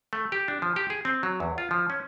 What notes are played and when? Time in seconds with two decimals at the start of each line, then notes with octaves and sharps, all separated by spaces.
0.13 A3
0.32 G4
0.48 D4
0.62 F3
0.76 G4
0.90 G#4
1.05 C4
1.23 F#3
1.40 E2
1.58 F4
1.71 F3
1.90 C#4